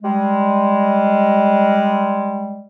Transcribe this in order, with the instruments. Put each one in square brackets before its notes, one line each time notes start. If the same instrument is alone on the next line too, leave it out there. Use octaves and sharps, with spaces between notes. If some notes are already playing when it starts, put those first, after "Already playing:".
[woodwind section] G3 G#3